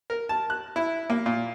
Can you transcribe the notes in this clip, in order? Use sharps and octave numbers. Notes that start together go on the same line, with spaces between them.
A#4
A5
F#6
E4
A#3
A#2